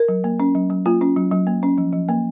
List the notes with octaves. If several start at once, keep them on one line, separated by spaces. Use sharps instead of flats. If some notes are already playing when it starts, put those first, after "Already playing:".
Already playing: A#4
F#3
A#3
C#4
F#3
F#3
A#3 F4
C#4
F#3
F#3
A#3
C#4
F3
F3
A#3